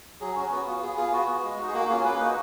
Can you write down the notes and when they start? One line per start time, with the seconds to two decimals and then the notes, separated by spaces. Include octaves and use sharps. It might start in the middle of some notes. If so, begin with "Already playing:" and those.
0.20 F#3 G#4
0.35 C#4 F#4
0.51 B3 F#4
0.67 F4
0.82 B3 G#4
0.97 F4 G#4
1.13 B3 F#4
1.28 F#4
1.43 G#3
1.58 D#4 F#4
1.68 G#4
1.74 A#3 F#4
1.89 C#4 F4 G#4
2.04 A#3 B4
2.20 D#4 F#4 B4